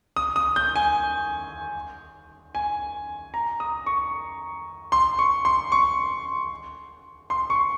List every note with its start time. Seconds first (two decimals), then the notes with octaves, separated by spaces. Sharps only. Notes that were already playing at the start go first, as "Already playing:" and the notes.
0.16 D#6
0.36 D#6
0.56 G6
0.76 G#5
2.55 G#5
3.34 A#5
3.60 D#6
3.86 C#6
4.92 C6
5.19 C#6
5.45 C6
5.72 C#6
7.30 C6
7.50 C#6